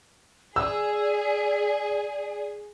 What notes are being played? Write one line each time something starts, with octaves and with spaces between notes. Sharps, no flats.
G#4 D5 E6